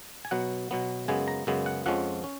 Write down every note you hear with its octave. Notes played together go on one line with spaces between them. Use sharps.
G#5
B2 F#3 B3 F#5
B2 F#3 B3
F#2 C#3 G#3 B3 G#5
A#5
F#2 C#3 G#3 B3
F#5
F2 F3 G#3 C#4 F#5
C#4